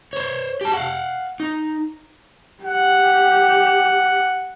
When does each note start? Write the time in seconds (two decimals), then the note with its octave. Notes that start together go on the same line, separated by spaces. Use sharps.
0.13 C5 C#5
0.61 G4 A5
0.73 F5 F#5
1.40 D#4
2.64 G4 F#5